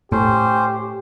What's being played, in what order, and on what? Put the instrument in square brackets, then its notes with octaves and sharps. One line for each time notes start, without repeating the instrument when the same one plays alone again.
[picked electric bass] A2 [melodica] C#4 C5 [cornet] G4